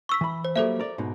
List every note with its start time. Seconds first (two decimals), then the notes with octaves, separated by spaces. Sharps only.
0.09 C#6 E6 B6
0.21 E3 B5
0.45 C5
0.56 F#3 G3 A#3 A4 C5 E5
0.80 A#4 D5
0.98 G#2 B2 D#4